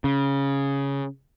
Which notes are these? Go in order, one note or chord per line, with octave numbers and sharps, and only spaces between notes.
C#3